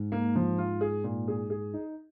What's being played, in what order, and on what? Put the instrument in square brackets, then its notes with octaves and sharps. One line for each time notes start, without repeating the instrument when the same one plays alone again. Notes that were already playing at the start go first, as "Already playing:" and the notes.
Already playing: [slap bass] G#2
[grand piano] A#3
F3
F4
G#4
A#2
G#4
G#4
D#4